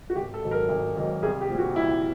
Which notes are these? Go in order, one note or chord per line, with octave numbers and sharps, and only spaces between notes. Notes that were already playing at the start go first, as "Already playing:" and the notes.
F#4
G#1 G4
A4
G#2 D#3 F#3
A#4
G#1
G#2 D#3 F#3
C2 G#4
G4
A#2 F3
F#4
C2 E4